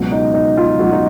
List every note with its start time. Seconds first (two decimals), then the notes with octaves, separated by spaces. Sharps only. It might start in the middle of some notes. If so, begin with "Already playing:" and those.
Already playing: C#2 B2 F#3
0.11 D#4
0.34 D#4
0.57 F4
0.79 C#2 B2 F#3 F#4
0.92 D#4